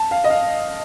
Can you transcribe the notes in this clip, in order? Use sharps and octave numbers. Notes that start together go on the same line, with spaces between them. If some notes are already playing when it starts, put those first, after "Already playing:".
Already playing: A5
F5
D#5
F5